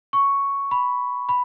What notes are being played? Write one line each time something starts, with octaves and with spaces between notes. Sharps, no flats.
C#6
B5
B5